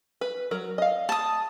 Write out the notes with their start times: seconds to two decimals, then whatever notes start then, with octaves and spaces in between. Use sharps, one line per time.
0.21 B4
0.51 F#3 A#4
0.78 D#5 F5
1.09 A5 D#6